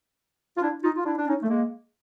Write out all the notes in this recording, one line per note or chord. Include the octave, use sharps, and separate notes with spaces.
F4
D4 E4
D#4 F4
F4
D4 E4
D4
C#4 D#4
A3
G#3 A#3